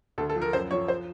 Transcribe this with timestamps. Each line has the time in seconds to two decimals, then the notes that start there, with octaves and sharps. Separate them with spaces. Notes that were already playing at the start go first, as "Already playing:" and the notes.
0.18 D2 A4
0.30 A4
0.36 F3
0.42 A#4
0.53 F#2 C5
0.71 F3 C#5
0.88 C5